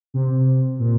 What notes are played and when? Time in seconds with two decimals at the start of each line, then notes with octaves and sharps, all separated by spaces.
0.14 C3
0.79 A#2